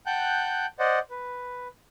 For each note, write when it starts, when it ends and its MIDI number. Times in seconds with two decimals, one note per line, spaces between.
0.06 0.66 78
0.06 0.66 79
0.06 0.66 81
0.06 0.66 90
0.06 0.66 91
0.79 0.99 72
0.79 0.99 74
0.79 0.99 75
0.79 0.99 78
1.10 1.68 71